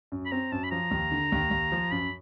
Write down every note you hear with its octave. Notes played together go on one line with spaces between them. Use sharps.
F#2
B5
C4 A#5
F#2 A5
B5
F3 A#5
D#2
D3
D#2
D#2
F3
F#2 B5